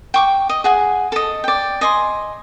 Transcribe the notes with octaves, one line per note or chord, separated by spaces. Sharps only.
G5 C#6 D6
D#5
G#4 F#5 G#5
A4 D#5
D5 G5
D#5 G#5 C6